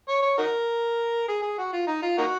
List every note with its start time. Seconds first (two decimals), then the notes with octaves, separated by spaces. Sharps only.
0.09 C#5
0.23 C#5
0.38 D#4 F#4 A#4
1.29 G#4
1.43 G#4
1.58 F#4
1.73 F4
1.87 D#4
2.03 F4
2.18 A#3 D#4 F#4